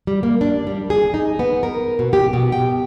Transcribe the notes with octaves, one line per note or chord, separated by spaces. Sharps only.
G3
A#3
D4
G3
G#4
D#4
B3
A#4
B2
G4
B2
G5